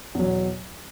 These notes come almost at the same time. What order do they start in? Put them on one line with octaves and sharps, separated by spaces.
E2 F#3 B2